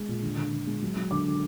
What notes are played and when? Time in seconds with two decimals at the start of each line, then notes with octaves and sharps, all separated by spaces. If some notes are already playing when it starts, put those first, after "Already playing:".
Already playing: G#3
0.08 A#2
0.22 D3
0.37 D3
0.52 D3
0.67 G#3
0.82 F#3
0.96 F#3
1.11 D3 D6
1.26 D3